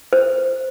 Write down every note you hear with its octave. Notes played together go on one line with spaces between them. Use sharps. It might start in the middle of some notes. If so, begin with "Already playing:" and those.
C5